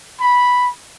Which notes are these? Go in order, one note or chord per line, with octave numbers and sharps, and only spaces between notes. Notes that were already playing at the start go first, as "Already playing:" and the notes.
B5